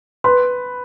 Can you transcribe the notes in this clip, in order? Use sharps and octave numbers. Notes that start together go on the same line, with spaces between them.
B4 C6